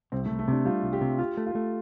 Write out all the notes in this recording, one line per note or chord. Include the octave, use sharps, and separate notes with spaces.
C2 C4
A3
C2
A3
C3 D4
G3 F4
C2
G4
C3
F4 G4
A3
F4
A3